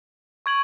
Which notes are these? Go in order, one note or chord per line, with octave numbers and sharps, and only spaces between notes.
C#6 G#6 D7 F#7